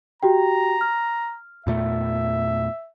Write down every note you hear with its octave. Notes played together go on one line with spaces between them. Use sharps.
F#4 G4 G5 A#5
F6
E2 A#2 A3 E5